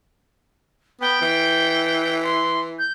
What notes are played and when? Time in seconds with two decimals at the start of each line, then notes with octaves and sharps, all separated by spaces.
1.01 B3 G5
1.21 E3
2.23 C6
2.79 G6